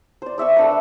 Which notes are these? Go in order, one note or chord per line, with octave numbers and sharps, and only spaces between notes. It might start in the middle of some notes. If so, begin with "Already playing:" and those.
C5 D5
D5 E5 C#6 E6
A3 D4 B4